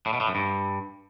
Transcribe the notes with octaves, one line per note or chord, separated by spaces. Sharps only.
A2
B2
A2
F#2
G2